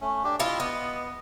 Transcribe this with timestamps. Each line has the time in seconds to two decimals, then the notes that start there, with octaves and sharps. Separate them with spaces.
0.01 A3 C#4
0.24 D4 G4
0.39 E4 F4 G4 D#5
0.60 B3